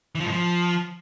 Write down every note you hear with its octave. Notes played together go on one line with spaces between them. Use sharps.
E3
F3
G#2
F3